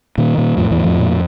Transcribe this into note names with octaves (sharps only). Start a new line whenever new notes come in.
A#2 D#3
A#2
F2 A2 F3
E2 E3
A2
F2 F3
A#2